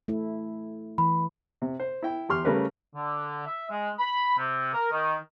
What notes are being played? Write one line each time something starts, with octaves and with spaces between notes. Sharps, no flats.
A3 E4
E3 B5
C3
C5
E4 G5
E2 G4 C6 F6
C#3 G3 A3 C#4 A#4 B4
D3
E5
G#3
B5
C3
A#4
D#3